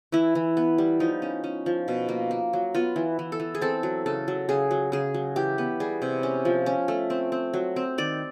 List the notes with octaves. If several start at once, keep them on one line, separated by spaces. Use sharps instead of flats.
E3 E4
E3
B3
G3
F3 D#4
C#4
C#4
F3
B2
A#3
A#3
F#3
B3 F4
E3
E3
A4
E3
G#4
C4 A4
F#3
C#3 A4
F#3
C#3 G#4
F#3
C#3 G#4
F#3
E3 G4
B3
G3 G#4
C3
C#4
F3
C#4
A3
C4
C4
F#3
C4
D#3 D5